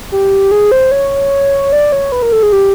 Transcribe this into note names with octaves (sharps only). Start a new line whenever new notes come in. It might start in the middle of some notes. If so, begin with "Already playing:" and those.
G4
G#4
C5
C#5
D5
C#5
B4
A#4
A4
G#4
G4